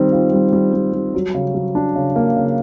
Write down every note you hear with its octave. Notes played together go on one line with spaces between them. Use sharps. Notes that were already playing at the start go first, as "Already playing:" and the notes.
Already playing: D#3 G3 C4
F4
G3
G3
G3
G3
F#3
C#3
F#3
D4
C#3
A#3
C#3